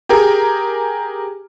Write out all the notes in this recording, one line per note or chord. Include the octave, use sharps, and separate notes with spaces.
G4 G#4 A#4